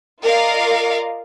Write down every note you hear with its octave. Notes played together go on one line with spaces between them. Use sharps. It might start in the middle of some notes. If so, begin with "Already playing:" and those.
F4 A#4 D5 D#5 F5